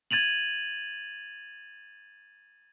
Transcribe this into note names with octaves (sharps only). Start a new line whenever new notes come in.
G#6 A6 D#7 F7 F#7